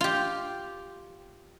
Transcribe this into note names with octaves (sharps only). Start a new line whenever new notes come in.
F4 G4